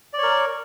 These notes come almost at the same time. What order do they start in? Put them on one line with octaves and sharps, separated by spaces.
D5 C#5 A#4